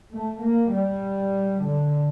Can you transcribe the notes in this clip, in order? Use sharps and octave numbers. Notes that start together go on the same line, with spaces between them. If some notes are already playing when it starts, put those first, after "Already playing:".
A3
A#3
G3
D3